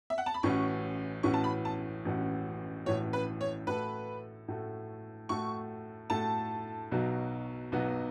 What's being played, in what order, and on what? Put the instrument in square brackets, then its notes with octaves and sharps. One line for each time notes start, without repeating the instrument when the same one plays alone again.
[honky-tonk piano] E5
F#5
A5
B5
[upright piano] A1 A2 E3 C#4 F#4 [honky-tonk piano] C#6
[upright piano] A1 A2 E3 C#4 F#4 [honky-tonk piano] C#6
[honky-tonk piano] A5
B5
A5
[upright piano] A1 A2 E3 C#4 F#4
[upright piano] A1 A2 E3 C#4 F#4 [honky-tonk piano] C#5
[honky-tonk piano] B4
C#5
[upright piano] A2 A3 F#4 A4 [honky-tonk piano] B4
[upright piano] A2 A3 F#4 A4
[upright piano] A2 A3 F#4 A4 [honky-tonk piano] C#6
[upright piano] A2 A3 F#4 A4 [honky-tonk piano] A5
[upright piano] B1 B2 F#3 B3 F#4
B1 B2 F#3 B3 F#4